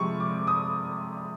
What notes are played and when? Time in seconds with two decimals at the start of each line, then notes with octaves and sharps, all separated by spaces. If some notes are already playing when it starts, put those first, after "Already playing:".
Already playing: C3 F3 G#3 C4 C#6
0.20 D6
0.47 D#6